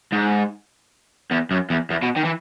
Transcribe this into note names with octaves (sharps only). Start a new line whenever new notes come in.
G#2
E2
F#2
E2
E2
B2
D#3
E3